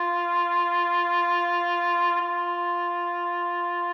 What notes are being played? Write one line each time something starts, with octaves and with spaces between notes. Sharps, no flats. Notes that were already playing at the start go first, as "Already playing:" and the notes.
Already playing: F4
F4